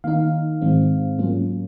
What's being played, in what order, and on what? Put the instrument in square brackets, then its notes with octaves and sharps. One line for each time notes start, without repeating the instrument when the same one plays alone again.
[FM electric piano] D#3 A#3 D#4 F5
G#2 D#3 G#3 C4
G#2 F#3 A#3 C#4 F4